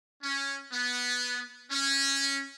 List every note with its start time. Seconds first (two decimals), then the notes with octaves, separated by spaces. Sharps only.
0.23 C#4
0.73 B3
1.71 C#4